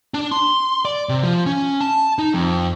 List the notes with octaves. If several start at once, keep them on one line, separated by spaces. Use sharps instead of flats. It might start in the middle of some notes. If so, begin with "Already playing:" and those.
D4
C6
D5
C3
F3
C#4
A5
D#4
F2